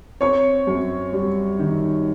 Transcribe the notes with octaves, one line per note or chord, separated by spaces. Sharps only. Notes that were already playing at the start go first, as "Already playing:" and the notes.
C4 C#5 C#6
F#2
G3
D#3